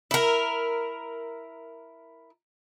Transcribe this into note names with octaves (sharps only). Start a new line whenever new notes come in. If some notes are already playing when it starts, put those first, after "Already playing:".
E4 A#4